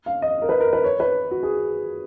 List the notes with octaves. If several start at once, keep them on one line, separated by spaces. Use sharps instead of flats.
F5
D#5
A#4
B4
A#4
B4
C#5
B4
F#4
G#4